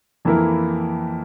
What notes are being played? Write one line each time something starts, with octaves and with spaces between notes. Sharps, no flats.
F2 E3 A#3 E4 A#4